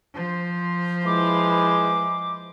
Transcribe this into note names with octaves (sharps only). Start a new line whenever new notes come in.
F3 C5
G#3 E4 B4 D6